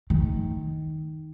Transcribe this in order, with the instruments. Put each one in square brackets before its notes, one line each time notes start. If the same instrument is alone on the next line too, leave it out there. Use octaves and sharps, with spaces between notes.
[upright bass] D#3